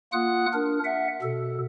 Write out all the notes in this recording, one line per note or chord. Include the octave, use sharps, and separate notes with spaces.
A#3 F4 F#5 D#6 F#6
D4 A#4
E5 F#5
B2 A4